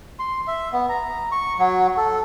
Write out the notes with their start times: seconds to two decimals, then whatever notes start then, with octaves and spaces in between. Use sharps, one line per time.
0.19 C6
0.48 E5
0.73 B3
0.89 A#5
1.32 C#6
1.59 F#3
1.97 A4